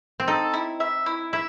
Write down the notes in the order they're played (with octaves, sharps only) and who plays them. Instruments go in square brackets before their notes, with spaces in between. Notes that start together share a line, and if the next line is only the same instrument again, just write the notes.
[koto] C4
[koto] D#4 [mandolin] A4
[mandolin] E4
E5
E4
[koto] E4 [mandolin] E5